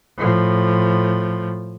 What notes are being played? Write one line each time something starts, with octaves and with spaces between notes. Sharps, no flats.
A2 F3